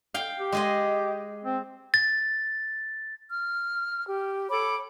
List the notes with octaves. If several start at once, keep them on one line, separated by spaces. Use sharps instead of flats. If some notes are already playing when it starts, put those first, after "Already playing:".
F5 G5
G4
G#3 G#4 D#5
C4
A6
F6
G4
A4 C#5 B5 D6